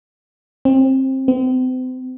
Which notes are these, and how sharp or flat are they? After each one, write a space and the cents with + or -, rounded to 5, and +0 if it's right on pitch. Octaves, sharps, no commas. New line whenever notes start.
C4 +20
C4 -40